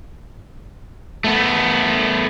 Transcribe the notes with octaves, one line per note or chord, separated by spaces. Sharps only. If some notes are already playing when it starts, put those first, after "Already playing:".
A3 B3